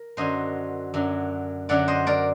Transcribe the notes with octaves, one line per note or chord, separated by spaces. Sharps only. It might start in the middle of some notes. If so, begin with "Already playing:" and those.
Already playing: A#4
F#2 D3 F#3 C5 D#5
F#2 D3 F#3
F#2 D3 F#3 D5 F#5
C5 D#5
A#4 D5